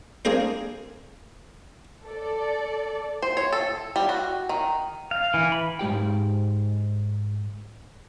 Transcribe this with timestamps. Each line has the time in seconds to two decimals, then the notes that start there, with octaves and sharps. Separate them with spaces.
0.25 A#3 C4 D4 G#4 A#4 C5
2.05 A4 D5
3.22 C5
3.37 C#5
3.53 A4
3.96 G3
4.09 F#4
4.49 D#3
5.11 F5
5.34 E3
5.52 B5
5.79 G#2 G#3 G4 G5